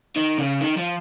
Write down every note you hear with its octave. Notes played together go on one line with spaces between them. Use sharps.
D#3
C#3
D#3
F3